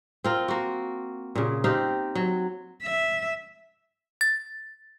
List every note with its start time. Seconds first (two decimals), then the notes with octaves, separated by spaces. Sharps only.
0.24 C4 F4 A#4
0.48 A#3 F#4
1.35 A#2 C#3
1.64 C4 D#4 G4 F5
2.15 F#3
2.83 E5
4.21 A6